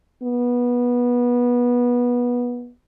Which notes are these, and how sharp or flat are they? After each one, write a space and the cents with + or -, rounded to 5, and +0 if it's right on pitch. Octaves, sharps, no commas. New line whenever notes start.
B3 -20